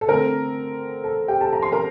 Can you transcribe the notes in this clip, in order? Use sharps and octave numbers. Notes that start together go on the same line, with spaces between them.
A4
D3 A3 C4 A#4
A4
G4 G5
A4 A5
A#5
C6
A#4 A#5